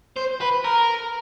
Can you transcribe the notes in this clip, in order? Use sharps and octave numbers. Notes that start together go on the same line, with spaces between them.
C5
B4
A#4